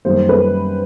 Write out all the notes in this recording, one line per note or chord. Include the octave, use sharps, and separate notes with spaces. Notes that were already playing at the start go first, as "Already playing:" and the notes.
F#2 D#3 G3 A#3 C5
B4